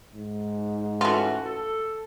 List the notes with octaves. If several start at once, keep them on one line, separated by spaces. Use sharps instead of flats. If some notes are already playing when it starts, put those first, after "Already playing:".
G#2
E3 A3 C#4 F4 F#4
A4